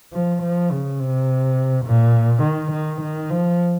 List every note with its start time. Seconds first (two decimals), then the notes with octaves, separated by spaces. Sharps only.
0.13 F3
0.42 F3
0.71 C#3
1.00 C3
1.85 A#2
2.43 D#3
2.72 D#3
3.01 D#3
3.30 F3